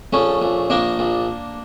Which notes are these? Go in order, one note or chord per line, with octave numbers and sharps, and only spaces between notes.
A#1 A3 C#4
A#1
A#1 A#3 D4
A#1